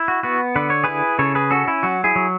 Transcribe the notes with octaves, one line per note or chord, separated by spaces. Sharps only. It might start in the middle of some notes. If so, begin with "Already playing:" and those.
Already playing: E4
F#4
B3 F#4
D3 B4
C#5
E4 G#4 B4
C#3 A4 C#5
G#4 B4
C#4 F#4 A4
E4
F#3 F#4
E4 G#4
F#3